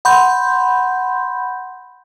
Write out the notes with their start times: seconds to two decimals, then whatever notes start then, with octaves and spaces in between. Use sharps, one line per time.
0.05 F#5 B5 C6 G6